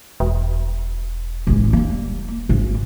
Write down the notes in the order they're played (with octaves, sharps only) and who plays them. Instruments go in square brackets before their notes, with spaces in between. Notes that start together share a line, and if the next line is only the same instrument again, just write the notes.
[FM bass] E1
[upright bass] A1 G#3
G3 A#3
G#1